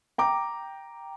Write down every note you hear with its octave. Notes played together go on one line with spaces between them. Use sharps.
G5 A#5 D6